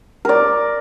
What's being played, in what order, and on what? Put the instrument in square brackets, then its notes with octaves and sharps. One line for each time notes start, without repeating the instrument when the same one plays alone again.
[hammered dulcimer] A#4 D5